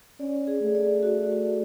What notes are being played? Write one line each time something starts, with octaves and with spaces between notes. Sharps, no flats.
C#4 D5
G#4
A3
D5
F#4
F#4